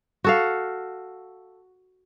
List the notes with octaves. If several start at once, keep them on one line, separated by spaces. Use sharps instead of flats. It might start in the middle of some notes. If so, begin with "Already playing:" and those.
F#4 A4 F5